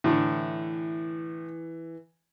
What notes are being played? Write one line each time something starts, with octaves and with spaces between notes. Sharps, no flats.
A2 D3 E3